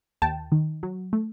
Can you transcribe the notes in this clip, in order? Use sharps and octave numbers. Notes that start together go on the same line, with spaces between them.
D#2 G5 A5
D#3
F#3
A3